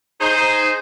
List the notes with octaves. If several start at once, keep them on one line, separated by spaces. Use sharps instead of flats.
D#4 G#4 C5